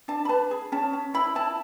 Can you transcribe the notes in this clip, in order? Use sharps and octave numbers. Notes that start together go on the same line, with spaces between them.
D4 A5
B5
B4 A5
G#4
C#4 A5
C#4
E4 B5
E4 A5